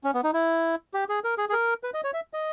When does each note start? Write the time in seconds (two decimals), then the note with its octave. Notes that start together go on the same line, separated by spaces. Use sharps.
0.04 C#4
0.14 B3
0.24 D#4
0.33 E4
0.94 G4
1.09 G#4
1.24 A#4
1.38 G#4
1.49 G#4
1.53 A#4
1.84 B4
1.94 D#5
2.04 C#5
2.13 E5
2.34 D#5